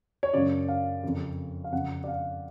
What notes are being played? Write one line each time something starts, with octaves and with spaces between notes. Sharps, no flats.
C#5
F#2 C#3 D5
F5
F2 C#3
F5
F2 C#3 F#5
D5
F5